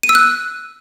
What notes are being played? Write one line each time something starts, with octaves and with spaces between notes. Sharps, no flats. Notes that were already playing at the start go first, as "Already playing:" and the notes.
D#7
E6
F#6